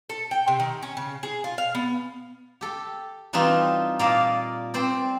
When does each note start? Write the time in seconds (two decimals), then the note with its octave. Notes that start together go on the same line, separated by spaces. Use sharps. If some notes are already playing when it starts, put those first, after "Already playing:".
0.09 A4
0.31 G5
0.48 C3
0.60 D#3
0.82 C#4
0.97 C#3
1.23 G#4
1.44 F4
1.58 F5
1.75 B3
2.61 G4 A4
3.33 E3 G3 C4 D4 D#4 F4
3.99 A#2 A#3 D5 D#5 F5 A5
4.74 C4 C5 D5